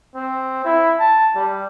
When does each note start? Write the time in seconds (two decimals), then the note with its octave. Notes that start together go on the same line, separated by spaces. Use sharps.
0.15 C4
0.65 E4
1.00 A5
1.36 G3